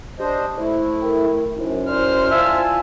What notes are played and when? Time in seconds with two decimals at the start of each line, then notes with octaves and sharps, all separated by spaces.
0.20 D4 G4 C5 D#5
0.58 A3 E4 C5
1.02 A#4 G5
1.57 F#2 D#4 E4 C5
1.89 E4 C5 D5 F6
2.31 F4 E5 G#5 A5